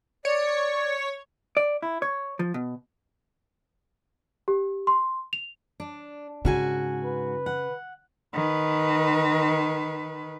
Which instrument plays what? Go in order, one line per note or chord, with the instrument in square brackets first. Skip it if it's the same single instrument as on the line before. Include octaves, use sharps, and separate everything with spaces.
[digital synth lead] C#5 [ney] D5
[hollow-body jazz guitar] D5
E4
C#5
F3
B2
[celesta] G4
C6
F7
[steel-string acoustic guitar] D4
[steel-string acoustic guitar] G#2 F#4 G#5 [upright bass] C#3
[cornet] B4
[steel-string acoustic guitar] F#5
[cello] D#3 B4